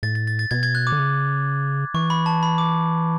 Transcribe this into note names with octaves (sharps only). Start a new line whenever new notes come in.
A2 A6
A6
A6
A6
B2 G#6
G#6
F#6
D6
D3
C#3
E3 C#6
B5
A5
B5
D6